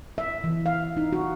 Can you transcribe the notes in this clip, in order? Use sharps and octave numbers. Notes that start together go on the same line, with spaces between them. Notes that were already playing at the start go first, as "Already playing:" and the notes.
E5
E3
F5
D#4
F#4